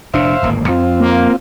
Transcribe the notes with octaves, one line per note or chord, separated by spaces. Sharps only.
F1 A#2 D4 C5 E5 F5
D1 G#1 A#3
F2 C4 F4
A#3